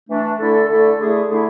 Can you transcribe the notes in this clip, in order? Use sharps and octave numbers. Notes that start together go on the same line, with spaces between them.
E3 A3 D4
D3 A3 E4 A4
D3 A3 E4 A4
D3 A3 E4 G#4
D3 A3 E4 G#4